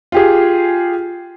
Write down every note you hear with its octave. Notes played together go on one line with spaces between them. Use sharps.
F4 G4 G#4